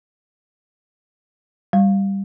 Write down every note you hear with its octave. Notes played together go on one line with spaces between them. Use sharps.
G3